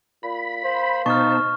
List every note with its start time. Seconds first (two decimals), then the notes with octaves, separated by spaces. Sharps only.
0.23 A#2 B5
0.64 A#3 C5
1.06 B2 D#4 C5 A5 C#6 F6